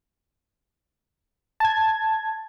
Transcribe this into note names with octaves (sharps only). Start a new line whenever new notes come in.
A5 G#6